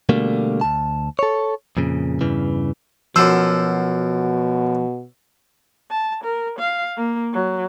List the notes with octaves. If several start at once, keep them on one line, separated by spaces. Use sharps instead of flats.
B2 D3 G3 A3 A#3
D2 A5
A4 C#5
F2 A#2 C#3
E2 G2 C#3 E3
F#2 B2 F3 C5 E6
A5
A#4
F5
A#3
F#3